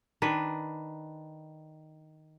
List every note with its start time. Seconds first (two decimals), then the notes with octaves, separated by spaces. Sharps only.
0.22 D#3 D4 B4